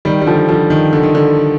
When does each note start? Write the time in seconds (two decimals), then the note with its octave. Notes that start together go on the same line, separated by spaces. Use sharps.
0.05 D#3 G3
0.21 G3
0.26 D3 F3
0.49 D3 F3
0.70 D#3
0.93 D3
1.03 D#3
1.15 D3